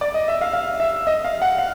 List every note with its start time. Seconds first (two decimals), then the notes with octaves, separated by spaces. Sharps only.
0.01 D5
0.14 D#5
0.28 E5
0.41 F5
0.53 F5
0.80 E5
1.07 D#5
1.24 F5
1.42 F#5
1.58 F5